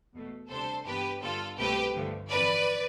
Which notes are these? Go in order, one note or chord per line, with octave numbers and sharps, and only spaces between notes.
E2 B2 A3
D2 C3 G3 D4 A4 C5
G2 E3 B3 D4 G4 B4
G2 D3 G3 B3 D4 F4 A4
C2 B2 A3 C4 G4 B4
G2 D3 F3 A3
G1 F2 E3 B4 D5